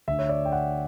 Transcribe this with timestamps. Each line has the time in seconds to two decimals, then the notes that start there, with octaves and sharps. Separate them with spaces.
0.07 D2 D3 E5
0.19 C#5
0.29 D5
0.45 G5
0.52 F#5